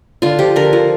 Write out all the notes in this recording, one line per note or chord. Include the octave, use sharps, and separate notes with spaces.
D3 F4
F3 G4
D3 A#4
F3